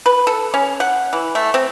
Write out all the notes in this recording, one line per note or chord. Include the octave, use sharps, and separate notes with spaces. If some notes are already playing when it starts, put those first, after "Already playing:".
B4
A4
C#4
F#5
E3
A3
C4